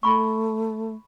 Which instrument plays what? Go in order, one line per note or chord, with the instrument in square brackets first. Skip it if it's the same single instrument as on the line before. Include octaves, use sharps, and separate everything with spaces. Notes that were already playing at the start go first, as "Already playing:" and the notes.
[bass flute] A3 [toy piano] B5 C#6